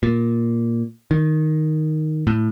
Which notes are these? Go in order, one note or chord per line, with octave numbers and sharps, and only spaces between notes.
A#2
D#3
A2